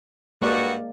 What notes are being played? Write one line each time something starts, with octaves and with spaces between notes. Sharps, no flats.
G2 G#3 A#3 F#4 D5